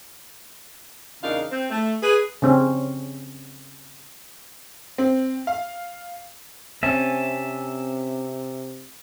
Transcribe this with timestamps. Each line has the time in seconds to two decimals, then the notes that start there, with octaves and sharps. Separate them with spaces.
1.22 E2 C#3 D4 D#4 A#4 F5
1.50 C4
1.70 A3
2.02 G#4 B4
2.42 C#3 C4 C#4
4.98 C4
5.47 F5
6.83 C3 C4 C#4 E5 G#5 A5